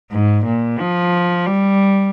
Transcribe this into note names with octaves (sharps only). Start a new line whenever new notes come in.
G#2
A#2
F3
G3